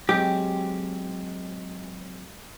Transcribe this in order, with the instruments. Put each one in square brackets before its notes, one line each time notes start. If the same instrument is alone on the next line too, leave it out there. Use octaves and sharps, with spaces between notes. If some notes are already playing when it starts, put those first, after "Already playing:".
[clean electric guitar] F#3 G#3 C4 [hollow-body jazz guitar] G4